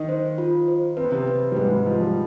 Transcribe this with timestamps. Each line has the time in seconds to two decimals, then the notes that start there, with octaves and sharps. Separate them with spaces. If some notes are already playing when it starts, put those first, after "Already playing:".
Already playing: D#3 D#4
0.09 C5
0.38 F4
0.68 C5
0.97 C4 B4
1.04 B3
1.12 C3 C4
1.27 B4
1.52 G3
1.56 G#2 G#3 B4
1.72 G3
1.86 F3 D#5
2.01 G3